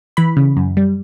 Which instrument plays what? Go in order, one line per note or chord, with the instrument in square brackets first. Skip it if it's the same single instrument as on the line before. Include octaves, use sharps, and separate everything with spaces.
[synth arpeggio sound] E3 B5
C#3
F#2
G3